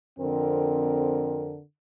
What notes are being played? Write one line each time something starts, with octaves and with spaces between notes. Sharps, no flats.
F2 D3 C4 A#4